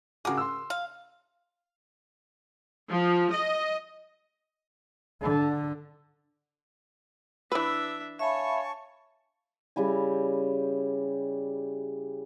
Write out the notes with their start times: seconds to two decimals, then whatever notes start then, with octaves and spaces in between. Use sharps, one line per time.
0.25 C#3 F#4 G#4 A#4 D6
0.37 C6 E6
0.70 F5
2.90 F3
3.33 D#5
5.22 D3
7.52 E3 D4 B4 E5 E6
8.19 C#5 E5 F5 G#5 A5 B5 C#6
9.76 C#3 G3 E4 G#5